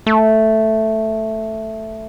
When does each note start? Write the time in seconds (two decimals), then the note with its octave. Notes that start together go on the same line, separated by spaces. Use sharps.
0.06 A3